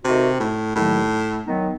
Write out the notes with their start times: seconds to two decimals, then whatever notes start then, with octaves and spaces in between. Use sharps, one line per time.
0.05 C3 D#3 A3 D#4 F#4
0.40 A2
0.75 D#2 A2 D#3 F#3
1.46 D#3 F#3 B3 D#4